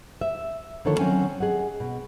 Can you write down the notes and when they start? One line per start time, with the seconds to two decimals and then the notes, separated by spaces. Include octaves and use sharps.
0.21 E5
0.85 D3 D#3 F3 A#3 A4 C#5
0.99 F#3 C4 C#4 G#5
1.40 G#4 D#5 F#5
1.80 B2